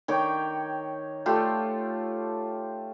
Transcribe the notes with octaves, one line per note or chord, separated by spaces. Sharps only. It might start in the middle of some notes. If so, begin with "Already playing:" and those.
D#3 C#5 G5 D6
A3 F4 G4 A4